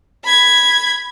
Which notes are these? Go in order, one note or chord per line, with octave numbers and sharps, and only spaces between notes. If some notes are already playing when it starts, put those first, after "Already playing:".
B5 G#6